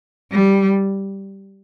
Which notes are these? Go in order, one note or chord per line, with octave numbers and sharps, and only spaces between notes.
G3